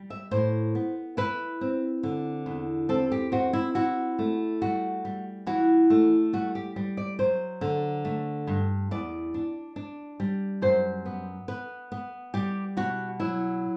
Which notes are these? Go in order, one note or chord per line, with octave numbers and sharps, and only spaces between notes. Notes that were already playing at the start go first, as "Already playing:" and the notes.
Already playing: G3
E5
A2 C5
B3
E4 B4
C4
D3
E2
C4 A4
G4
C4 F#4
E4
E4 F#4
A3
G3 F#4
G3
E3 F#4
A3
G3 F#4
G4
G3
D5
F#3 C5
D3
A3
G2
E2 D5
D4
D4
G3
F#2 C5
B3
B3 B4
B3
G3 G4
B2 F#4
F#3 E4